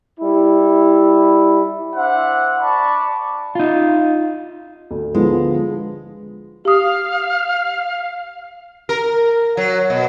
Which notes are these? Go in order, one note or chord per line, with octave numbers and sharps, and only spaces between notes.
G3 E4
D4 C5 E5 F#5
D5 A5 B5 C#6
D#4 F4
D2
D3 F3 G#3 B3
G4 F5 D#6
A#4
F#3
B2